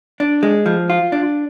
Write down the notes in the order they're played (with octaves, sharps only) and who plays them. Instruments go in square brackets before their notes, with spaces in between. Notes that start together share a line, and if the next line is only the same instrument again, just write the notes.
[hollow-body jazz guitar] D4
G#3
F3
F4
D4